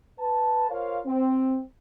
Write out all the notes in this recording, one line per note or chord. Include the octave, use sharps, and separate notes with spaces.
B4 A5
F4 A#4 C5 C#5 F5
C4